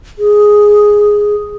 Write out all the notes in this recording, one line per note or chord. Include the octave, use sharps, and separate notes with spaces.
G#4